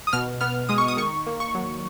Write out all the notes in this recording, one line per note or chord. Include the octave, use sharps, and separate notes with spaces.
D#6
B2 F6
B3 F6
G#3 D#6
C#6
D#6
D#3 C#6
A#3
C#6
F#3